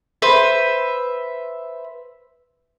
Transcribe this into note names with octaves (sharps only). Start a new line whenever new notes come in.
B4 C5 E5